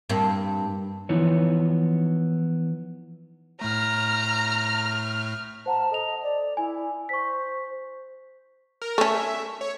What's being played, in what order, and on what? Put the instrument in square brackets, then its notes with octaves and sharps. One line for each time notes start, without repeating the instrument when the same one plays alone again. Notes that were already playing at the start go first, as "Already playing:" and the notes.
[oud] G2 A#3 C4
[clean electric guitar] E3 F3 B3 D#4 E4 C#5
[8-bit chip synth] A2 A3 [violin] A#5 [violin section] F6
[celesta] C5 F#5 A#5 [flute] A5
[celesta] A4 F7 [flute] D#5
[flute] D5
[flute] E4 [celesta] G#5
[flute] C5 [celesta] C#6 B6
[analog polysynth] A#4
[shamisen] A3 C#4 [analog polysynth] E5
[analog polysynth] C#5